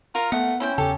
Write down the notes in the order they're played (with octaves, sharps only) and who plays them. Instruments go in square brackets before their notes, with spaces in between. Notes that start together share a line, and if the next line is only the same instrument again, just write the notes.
[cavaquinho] F4 [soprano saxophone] A#4
[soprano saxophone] A3 [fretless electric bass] B3 [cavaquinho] F#5
[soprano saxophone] C#4 [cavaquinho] E4 C5 G5
[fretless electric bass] E2 C#3 [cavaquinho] G4 A4